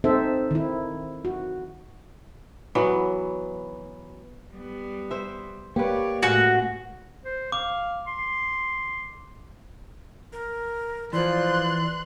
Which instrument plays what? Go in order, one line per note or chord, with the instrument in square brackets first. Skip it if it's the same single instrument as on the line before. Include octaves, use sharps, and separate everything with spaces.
[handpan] C4 D#4 A4 C5 E5
D#3 E4
F#4
[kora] E3 F#3 B3
[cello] G3 B3
[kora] C5 E5
[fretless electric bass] A#3 [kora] G4 B4 [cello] C#5 D5
[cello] A2 G#3 [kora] C#4 [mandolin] F#4
[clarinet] C5
[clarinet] F5 [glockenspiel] D6
[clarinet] C6
[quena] A#4
[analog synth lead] E3 [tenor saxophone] F3 [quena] D5 [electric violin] C6 F#6